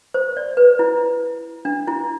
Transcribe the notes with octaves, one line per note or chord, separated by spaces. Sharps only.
C5
D5
B4
E4
D4
E4